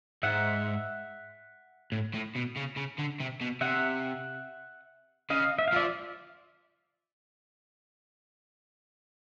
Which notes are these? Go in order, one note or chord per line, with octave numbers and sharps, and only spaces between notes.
G#2 E5 F#5
A2
A2
B2
C#3
C#3
D3
C3
B2
C3 E5 F#5
C#3 D#5 F5
E5
F5
F3 D5 E5